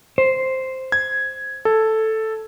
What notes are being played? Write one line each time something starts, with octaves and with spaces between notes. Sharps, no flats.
C5
G#6
A4